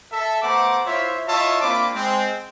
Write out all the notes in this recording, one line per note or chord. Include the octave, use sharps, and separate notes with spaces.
A4 E5
A3 B3 C5 F#5 A#5 D6
E4 F4 C5 C#5 E5
E4 F4 C#5 D#5 E5 A5
A#3 C4 D4 F4 B5 D6
G#3 C4